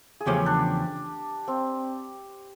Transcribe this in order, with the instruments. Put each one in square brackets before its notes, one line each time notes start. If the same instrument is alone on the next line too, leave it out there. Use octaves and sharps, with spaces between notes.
[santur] G#4
[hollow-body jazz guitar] E2 C#3 F3 A3 C#4 [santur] G4
[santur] D4
C4